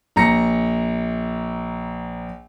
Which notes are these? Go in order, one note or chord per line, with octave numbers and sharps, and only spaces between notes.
A#1 A#5 A#6 C#7